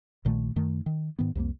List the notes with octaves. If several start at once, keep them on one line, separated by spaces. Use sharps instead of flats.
A#1 A#2 D#3 A3
F#2 D#3 A3
D#3
G#2 D#3 B3
C2 F2 F#3 A#3